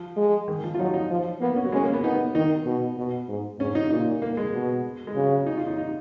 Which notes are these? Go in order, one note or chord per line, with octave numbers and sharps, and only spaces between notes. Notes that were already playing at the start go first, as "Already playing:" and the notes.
Already playing: F3
G#3
D#3
F3
F4
F#3 D#4
D#4
F3
A#3 B3
C#4
F#3
G#3 C#4
A#3
B3
B3 D#4
D#3 D#4
B2
B2
G#2
G#2 C#4
D#4
A#2 D#4
A#3
G#3
B2
G#3
C#3 F#3
D#4
F4
D#4
D#4